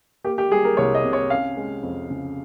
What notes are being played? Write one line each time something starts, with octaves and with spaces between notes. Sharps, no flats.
A#3 G4
G4
G3 G#4
A#4
C2 C#5
D#5
C3
C#5
C#4 F5
G#3
F2
C#3